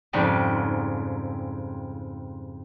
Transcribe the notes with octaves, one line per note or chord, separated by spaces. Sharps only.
F2 G#2 C#3 G3